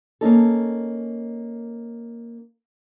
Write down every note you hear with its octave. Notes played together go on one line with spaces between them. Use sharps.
A#3 C#4 D#4 A4